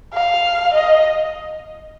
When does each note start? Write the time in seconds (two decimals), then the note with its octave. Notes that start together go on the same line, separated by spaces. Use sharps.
0.14 F5
0.74 D#5